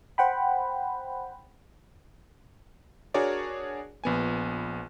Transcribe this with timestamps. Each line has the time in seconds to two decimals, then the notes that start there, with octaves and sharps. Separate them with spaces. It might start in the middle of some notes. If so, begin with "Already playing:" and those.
0.18 C5 F#5 G5 B5
3.14 D4 F#4 G#4 A#4 C#5 D5
4.04 A#1 B3 G#5